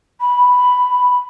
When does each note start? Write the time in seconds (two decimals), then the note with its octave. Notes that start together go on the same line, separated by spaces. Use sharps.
0.21 B5